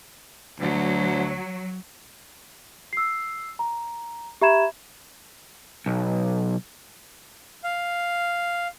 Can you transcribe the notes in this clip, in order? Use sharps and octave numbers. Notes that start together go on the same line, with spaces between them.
D2 F#3
E6 C7
A#5
G4 E5 A#5 B5 G#6 E7
B1
F5